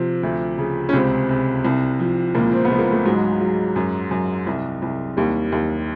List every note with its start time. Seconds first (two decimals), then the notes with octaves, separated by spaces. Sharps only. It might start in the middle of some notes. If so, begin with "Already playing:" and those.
Already playing: C3 F3 C4
0.23 D2
0.58 C#3
0.89 C#4
0.93 C#2 C3 C4
1.29 C3
1.65 C2
1.99 F3
2.35 C#2 A#2 A#3
2.52 C4
2.65 B3
2.70 C#2
2.78 A#3
2.92 A3
3.05 G#2 F#3 G#3
3.40 F#3
3.76 F#2
4.11 F#2
4.47 C2
4.82 C2
5.17 D#2 G3
5.52 D#2